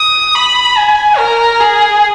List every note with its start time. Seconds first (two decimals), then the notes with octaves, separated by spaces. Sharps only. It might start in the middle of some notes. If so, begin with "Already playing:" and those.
Already playing: D#6
0.35 B5
0.77 G#5
1.18 A#4
1.60 G#4